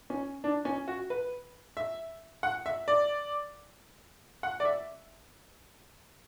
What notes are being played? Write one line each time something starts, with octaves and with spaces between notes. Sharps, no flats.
C#4
D4
C#4
F#4
B4
E5
F#5
E5
D5
F#5
D5
E5